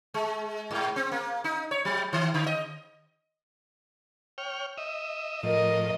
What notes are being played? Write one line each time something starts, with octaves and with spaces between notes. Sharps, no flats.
G#3
G#2
C4
A#3
D#4
C#5
F#3
D#3
D3
D#5
C#5 G5 F6
D#5 E5
A2 F3 A#4 D#5